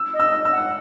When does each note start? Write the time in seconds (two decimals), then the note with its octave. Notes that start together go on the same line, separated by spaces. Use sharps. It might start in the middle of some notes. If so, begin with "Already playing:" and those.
Already playing: E6
0.14 D#5
0.20 E6
0.45 E6
0.52 F#5